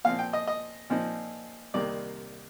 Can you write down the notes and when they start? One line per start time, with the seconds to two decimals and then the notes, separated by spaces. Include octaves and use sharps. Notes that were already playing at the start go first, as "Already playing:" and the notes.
0.04 A#2 F3 C4 F5
0.19 G5
0.33 D#5
0.47 D#5
0.90 A#2 F3 C4 D#4
1.74 C2 C3 D#3 A#3 D5